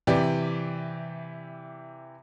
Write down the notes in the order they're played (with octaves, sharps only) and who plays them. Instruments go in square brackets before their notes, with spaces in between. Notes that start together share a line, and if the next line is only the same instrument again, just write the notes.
[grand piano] C3 E3 G4 D5